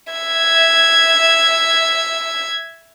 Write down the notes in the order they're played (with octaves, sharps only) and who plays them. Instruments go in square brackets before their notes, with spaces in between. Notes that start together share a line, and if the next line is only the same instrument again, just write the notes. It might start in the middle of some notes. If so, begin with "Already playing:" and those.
[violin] E5 G#6